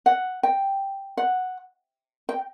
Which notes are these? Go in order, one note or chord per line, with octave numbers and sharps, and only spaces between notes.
F#5
G5
F#5
G5